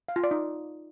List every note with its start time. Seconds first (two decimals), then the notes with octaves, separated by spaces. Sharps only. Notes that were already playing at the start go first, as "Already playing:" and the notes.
0.08 F5
0.16 F4
0.24 D5
0.31 D#4